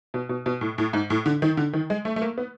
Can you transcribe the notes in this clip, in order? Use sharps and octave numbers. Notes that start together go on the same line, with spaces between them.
B2
B2
B2
A2
A2
G#2
A2
D3
D#3
D3
D#3
G#3
A3
A3
A#3
B3